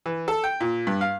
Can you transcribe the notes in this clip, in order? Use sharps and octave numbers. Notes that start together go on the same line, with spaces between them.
E3
A4
G5
A#2
G2
F5